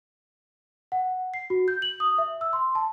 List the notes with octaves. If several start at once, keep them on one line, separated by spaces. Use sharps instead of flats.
F#5
C7
F#4
G6
F#7
D#6
E5
E6
C6
A5